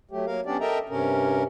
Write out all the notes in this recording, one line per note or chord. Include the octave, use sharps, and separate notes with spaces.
F#3 A3 G4
F#3 A#3 A#4 F5
B3 C#4 D4 G4 D5
A4 A#4 D#5 E5 G5 A#5
G2 C3 C#4 A#4